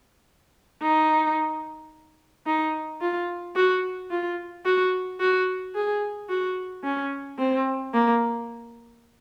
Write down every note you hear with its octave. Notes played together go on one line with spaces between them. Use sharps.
D#4
D#4
F4
F#4
F4
F#4
F#4
G#4
F#4
C#4
C4
A#3